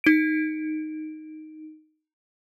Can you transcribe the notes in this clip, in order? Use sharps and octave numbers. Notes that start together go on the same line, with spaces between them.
D#4 D7